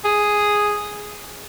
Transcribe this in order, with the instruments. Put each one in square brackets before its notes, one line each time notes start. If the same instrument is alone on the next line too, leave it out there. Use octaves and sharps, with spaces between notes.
[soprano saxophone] G#4